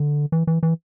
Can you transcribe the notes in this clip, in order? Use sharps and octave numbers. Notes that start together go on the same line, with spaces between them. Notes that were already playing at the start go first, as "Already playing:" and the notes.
Already playing: D3
E3
E3
E3